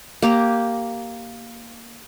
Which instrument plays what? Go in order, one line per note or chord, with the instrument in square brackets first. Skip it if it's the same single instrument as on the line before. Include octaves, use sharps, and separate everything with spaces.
[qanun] A#3 G4 A#5